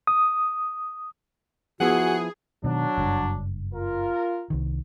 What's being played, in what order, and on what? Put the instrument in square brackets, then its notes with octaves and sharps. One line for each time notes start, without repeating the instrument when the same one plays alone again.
[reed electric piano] D#6
[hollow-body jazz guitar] F3 B3 E4 [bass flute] F#4 [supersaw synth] G#4 [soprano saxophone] F#5
[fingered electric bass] B2 D#3 [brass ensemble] F#3 D4
[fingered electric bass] F#1 G2
[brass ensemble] F4 A#4
[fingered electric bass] C2 D#3